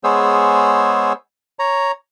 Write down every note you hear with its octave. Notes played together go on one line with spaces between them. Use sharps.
G#3 B3 G#4 C5 C#5 E6
C#5 A#5